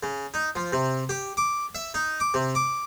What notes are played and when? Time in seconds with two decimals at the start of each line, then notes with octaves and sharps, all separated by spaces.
0.03 C#3
0.34 D#4
0.55 F3
0.73 C3
1.09 G4
1.37 D6
1.75 E5
1.94 D#4
2.20 D6
2.34 C3
2.55 D6